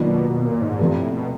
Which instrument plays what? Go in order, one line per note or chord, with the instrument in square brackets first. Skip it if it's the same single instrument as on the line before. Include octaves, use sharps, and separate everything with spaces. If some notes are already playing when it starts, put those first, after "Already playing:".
Already playing: [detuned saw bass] B2 [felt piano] D#3 F#3 A#3 D4 F4
[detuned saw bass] B2
A#2
G#2
[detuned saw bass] G2 [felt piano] C3 F3 A3
[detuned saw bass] A2
B2